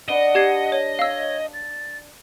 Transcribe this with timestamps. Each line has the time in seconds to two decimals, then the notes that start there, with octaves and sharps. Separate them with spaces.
0.09 D4 B4 D#5 F#5 G7
0.35 G4 G#6 C7
0.72 C#5
0.99 C#5 F5 E6
1.53 A6